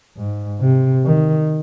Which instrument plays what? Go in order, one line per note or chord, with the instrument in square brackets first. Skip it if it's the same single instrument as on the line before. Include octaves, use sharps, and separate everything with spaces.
[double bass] G#2
C3
D#3